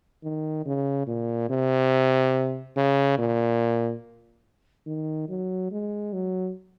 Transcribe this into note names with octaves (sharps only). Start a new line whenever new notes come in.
D#3
C#3
A#2
C3
C#3
A#2
D#3
F#3
G#3
F#3